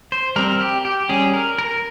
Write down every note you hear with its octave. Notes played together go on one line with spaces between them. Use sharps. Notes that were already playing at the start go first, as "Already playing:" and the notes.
C5
G3 C4 A#4
G4
G4
G3 C#4 G#4
A#4
A#4